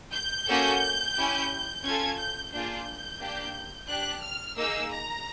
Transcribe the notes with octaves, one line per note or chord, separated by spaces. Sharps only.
G6
A#3 C#4 F#4 A4
C#4 E4 G4
C#4 F4 A4 G#6
G6
A#3 D4 F4 G#4 G6
A#3 D4 G4
D4 G4 F#6
F6
A#3 D#4 G#4 E6
A#5